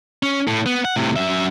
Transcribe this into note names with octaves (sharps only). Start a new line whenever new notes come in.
C#4
A2
B3
F#5
A2 C3
F#2 E5